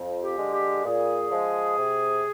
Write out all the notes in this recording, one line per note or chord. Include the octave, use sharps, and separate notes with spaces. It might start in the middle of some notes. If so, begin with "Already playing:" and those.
Already playing: F2
G4
D3 G#3
G4
A#2 G#4
F3 G#3
C3